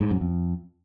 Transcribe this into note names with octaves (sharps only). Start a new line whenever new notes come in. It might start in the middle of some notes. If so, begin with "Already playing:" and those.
G#2
F#2
F2